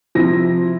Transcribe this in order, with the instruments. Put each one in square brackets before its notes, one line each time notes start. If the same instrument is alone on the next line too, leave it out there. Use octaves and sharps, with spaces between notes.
[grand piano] C3 F3 C4 E4 A#6